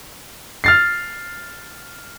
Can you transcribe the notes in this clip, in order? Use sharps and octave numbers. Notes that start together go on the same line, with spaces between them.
F6 A6 C7